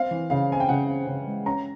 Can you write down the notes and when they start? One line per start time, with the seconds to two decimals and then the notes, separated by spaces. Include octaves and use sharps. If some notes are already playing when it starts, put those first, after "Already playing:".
Already playing: C4 F5
0.11 E3
0.30 C#3 F5
0.50 C4 G#5
0.60 G5
0.69 C#3 F#5
0.89 C4
1.07 C#3
1.27 G#3
1.46 C#4 A#5